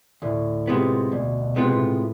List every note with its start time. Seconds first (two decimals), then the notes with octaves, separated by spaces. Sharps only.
0.22 D2 A2
0.67 C3 G#3 B3 F4
1.12 D2 B2
1.41 B2
1.56 C3 G#3 B3 F4
1.72 A2